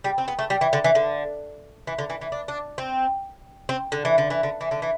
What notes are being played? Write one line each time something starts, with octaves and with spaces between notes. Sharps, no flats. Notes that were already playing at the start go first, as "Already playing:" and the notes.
G3
C4
B3
A3
G3
E3
D3
E3
D3
E3
D3
E3
E3
D4
D4
C4
C4
D3
E3
D3
E3
D3
E3
D3
E3